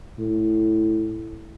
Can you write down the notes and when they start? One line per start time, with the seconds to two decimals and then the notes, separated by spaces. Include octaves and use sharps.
0.19 A2